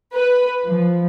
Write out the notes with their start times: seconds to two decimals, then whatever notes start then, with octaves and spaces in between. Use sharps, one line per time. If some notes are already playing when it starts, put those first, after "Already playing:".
0.13 B4
0.68 F3